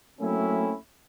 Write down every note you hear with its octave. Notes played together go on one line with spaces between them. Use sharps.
F#3 A3 A#3 C4 C#4 E4